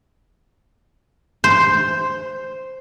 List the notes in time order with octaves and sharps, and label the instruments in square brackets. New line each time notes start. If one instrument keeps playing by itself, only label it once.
[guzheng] C5